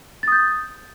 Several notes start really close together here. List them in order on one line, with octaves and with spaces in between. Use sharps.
A6 D#6 G6